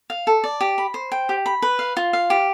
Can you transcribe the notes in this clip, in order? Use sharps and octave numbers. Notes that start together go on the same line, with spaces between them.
F5
A4
D5
G4
B5
C5
G5
G4
B5
B4
F5
F4
F5
G4